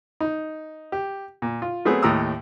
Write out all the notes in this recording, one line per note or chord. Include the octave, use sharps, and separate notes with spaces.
D#4
G4
A#2
F4
F#3 A3 B3 C4 G#4
D#2 A2 G4 A#5 D#6 E6